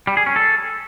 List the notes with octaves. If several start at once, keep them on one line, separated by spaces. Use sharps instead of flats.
G3
G#4
C#4
A4